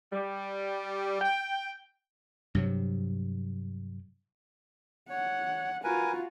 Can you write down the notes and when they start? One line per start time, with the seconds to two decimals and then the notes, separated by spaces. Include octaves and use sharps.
0.13 G3
1.21 G5
2.55 G2 C3 F#3
5.09 C#5 F#5
5.84 F4 F#4 A#4 B4 G#5